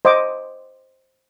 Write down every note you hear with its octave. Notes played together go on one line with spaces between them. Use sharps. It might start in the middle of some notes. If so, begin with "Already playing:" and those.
C5 D#5 F#5 D6